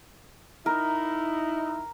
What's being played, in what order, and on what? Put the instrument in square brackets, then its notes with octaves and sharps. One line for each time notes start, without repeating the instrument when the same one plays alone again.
[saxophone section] D#4 E4 [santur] A#4